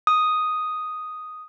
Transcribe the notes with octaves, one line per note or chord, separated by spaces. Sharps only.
D#6